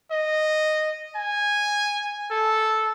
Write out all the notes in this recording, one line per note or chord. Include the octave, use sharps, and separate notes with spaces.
D#5
G#5
A4